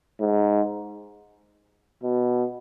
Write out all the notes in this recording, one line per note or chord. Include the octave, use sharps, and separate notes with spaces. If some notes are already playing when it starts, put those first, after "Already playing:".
G#2
B2